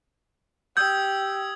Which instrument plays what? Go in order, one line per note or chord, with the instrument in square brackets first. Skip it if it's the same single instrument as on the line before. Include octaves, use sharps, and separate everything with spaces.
[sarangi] G4 [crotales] D#6 E6 G#6 [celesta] G6